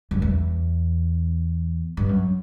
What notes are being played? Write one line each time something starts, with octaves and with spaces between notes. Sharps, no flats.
F#2
E2
G2
F#2